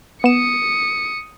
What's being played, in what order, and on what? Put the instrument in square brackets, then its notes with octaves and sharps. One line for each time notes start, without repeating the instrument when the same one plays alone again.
[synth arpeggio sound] B3 E7 [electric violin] D#6 C#7